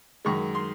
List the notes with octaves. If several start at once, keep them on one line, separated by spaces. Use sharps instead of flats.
F#2 D#3 G#3 C#6
C6